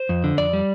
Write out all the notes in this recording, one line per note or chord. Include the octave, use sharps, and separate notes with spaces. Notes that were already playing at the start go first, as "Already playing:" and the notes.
Already playing: C5
F2
D3
F2 D5
G3